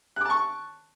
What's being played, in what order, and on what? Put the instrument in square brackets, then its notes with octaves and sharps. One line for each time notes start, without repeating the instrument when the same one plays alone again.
[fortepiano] F#6
D6
A5
C#6